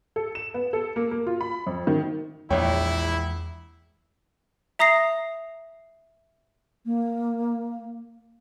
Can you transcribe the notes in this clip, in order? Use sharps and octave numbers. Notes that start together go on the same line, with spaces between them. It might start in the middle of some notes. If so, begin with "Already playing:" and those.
A4
E7
B3
A4
A#3
A#3
F4
B5
F2
D#3
A#1 E2 G#3 E4 C#5 G5
E5 A#5 D#6 A#6 C7
A#3